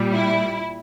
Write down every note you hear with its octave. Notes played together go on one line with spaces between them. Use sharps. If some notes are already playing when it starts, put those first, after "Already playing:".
Already playing: A#2 G3
E4